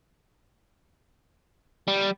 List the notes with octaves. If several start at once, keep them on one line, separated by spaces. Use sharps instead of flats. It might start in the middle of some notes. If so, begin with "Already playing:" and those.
G3